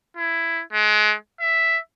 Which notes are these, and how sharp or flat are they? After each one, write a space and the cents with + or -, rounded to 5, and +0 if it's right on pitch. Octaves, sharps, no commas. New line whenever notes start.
E4 +10
G#3 +35
E5 +0